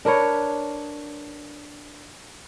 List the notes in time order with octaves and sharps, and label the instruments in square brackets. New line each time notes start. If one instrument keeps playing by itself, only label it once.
[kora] D4 A#4 B4 C#5